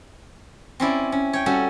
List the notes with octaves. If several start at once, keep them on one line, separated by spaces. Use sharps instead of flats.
C4 C#4 E4 D5
C#4
C#5 G5
G3 C#4 F#4 A4